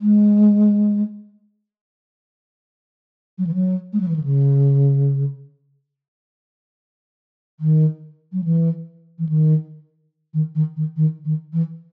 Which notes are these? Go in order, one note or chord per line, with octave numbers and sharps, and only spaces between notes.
G#3
F#3
E3
F#3
G#3
F#3
E3
D#3
C#3
D#3
F#3
E3
E3
D#3
D#3
D#3
D#3
D#3
D#3
E3